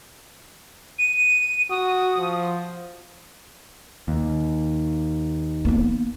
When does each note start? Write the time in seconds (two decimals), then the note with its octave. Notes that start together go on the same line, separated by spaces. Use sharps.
0.99 D#7
1.70 F#4 D#6
2.18 F3
4.08 D#2
5.65 A#3 B3